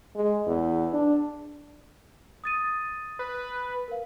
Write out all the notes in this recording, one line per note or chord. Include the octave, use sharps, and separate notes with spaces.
G#3
E2
D4
D#6 A6 D#7
B4
A#4 F5